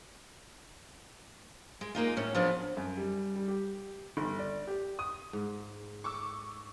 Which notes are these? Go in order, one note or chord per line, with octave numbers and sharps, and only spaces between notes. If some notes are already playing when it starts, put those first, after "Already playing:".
G#3
G#3 A#3 D#4 F4
A2 C#4
F3 F#3 B3 D4 G#4 D#5
F#2
G3
G3
G4
G1
D5
G4
D#6
G#2
C#6 D6 E6